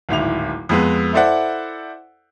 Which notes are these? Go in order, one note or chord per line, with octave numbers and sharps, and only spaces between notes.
D1 G#1 E4 F7
F2 G#3 B3
E4 A4 C5 D5 E5 F#5